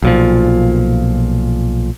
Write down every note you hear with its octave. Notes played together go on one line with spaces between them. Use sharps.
B1 A#2 F3